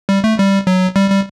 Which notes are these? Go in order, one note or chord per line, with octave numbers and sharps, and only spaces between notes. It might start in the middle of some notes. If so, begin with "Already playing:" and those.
G3
A3
G3
F#3
G3
G3